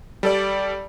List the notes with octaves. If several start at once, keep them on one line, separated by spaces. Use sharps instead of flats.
G3 A4 D5